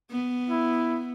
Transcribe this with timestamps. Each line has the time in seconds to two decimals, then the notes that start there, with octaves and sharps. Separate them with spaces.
0.11 B3
0.50 E4